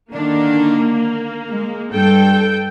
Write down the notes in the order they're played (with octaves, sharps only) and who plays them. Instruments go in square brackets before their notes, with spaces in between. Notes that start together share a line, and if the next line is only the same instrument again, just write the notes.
[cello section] D3 D#3 D4 [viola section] A#3
[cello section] G#3
[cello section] G2 [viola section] A4 G5